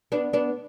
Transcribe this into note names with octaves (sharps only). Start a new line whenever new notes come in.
B3 D4
B3 D4